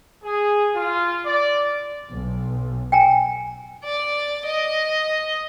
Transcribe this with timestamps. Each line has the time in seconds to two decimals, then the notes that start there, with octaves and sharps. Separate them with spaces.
0.23 G#4
0.75 F4
1.26 D5
2.10 B1
2.92 G5 G#5 A#5
3.84 D5
4.46 D#5